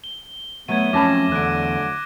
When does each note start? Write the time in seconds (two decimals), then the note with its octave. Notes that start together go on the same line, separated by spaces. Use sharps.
0.04 G7
0.68 F#3 A3 B3 E5 G#6 D#7
0.93 F2 C#4 A5 B5 D6 A#6
1.32 E2 D3 F#6 D7